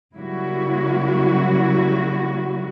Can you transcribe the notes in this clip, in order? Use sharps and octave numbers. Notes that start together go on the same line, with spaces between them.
C#3 F#3 G3 A#3 E4 F#4